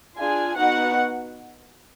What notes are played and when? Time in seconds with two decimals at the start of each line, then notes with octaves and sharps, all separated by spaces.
0.18 D4 F4 G#4 G#5
0.56 B3 D#4 F#4 F#5